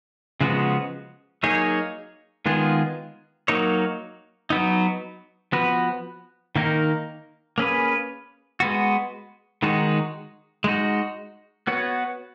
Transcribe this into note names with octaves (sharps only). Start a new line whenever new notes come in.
C#3 F3 G#3 B3 F#4
F#3 A#3 D#4 G#4 C#5
D#3 G#3 B3 F4 G#4
F#3 A#3 D#4 A#4 C#5
F#3 B3 D#4
F3 B3 F#4 B4
D#3 A#3 D#4 A#4
A#3 C#4 G#4 B4
G#3 B3 F#4
D#3 G#3 D#4 F#4
G#3 D#4 F#4
B3 F#4 C#5